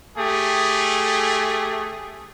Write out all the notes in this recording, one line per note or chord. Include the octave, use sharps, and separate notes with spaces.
A3 G4 G#4